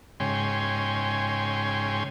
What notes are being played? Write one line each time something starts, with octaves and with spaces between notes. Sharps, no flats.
G#2 C#3 C#5 G5 G#5 C6